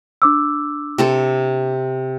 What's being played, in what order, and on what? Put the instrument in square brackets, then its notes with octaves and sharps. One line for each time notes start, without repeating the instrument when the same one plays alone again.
[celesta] D4 D6 E6
[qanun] C3 C4 A4